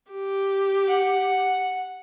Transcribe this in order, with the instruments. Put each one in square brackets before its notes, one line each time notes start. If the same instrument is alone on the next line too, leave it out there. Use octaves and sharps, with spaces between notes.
[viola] G4
[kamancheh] F#5